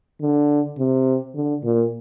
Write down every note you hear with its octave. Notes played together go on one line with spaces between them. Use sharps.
D3
C3
D3
A#2